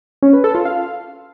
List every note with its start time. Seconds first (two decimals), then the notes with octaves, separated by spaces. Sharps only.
0.23 C#4
0.33 B4
0.44 A4
0.55 F4
0.65 F5